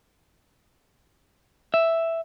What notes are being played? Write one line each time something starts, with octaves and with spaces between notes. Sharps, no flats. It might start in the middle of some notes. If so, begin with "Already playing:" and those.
E5